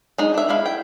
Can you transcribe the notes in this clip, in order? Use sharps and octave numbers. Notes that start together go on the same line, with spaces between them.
G#3 D#4
D4 E5
G#3 E4 F5
G5